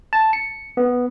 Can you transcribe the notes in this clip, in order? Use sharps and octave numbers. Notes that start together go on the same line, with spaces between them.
A5
C#7
B3